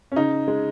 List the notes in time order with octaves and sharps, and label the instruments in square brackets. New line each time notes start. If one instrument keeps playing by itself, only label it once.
[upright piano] C#4
C#3 D#4
G#3